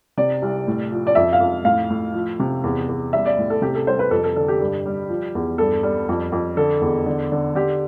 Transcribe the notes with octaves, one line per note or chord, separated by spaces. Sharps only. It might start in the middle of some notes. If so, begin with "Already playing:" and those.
C3 D5
C2
A2
F3
D5
F2 E5
F5
F2
A2 F5
A2
F3
C3
E2
E2
G3 E5
D5
A2
A4
C3 G4
A4
C2 C5
B4
F2 A4
A4
D3 A4
G4
G2
G3
F3
E2
G2 A4
G3
F2
F2
D3 A4
E2
D3
D3
D3 G4